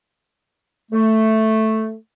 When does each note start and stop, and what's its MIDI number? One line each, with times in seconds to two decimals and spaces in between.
0.92 1.94 57